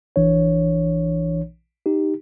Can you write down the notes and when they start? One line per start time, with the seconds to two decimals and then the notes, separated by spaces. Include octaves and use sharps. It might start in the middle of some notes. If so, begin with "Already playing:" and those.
0.16 A#1 E3 D4 C#5
1.86 D#4 G4